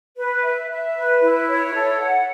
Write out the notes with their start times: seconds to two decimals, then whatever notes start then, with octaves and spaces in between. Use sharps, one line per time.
0.17 B4
0.43 E5
0.70 E5
0.96 B4
1.22 E4
1.48 C#5
1.73 A4
2.00 F#5